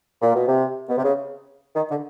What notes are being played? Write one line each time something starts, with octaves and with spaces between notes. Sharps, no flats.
A#2
B2
C3
B2
C3
C#3
D#3
D3